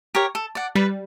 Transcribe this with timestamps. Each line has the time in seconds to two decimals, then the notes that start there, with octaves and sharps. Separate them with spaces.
0.15 G4 A#4 C#5
0.35 A4
0.55 D5 F#5
0.75 G3 B4